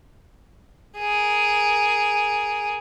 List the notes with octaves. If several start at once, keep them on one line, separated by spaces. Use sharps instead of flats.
G#4 A#4